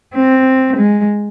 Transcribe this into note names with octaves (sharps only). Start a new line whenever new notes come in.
C4
G#3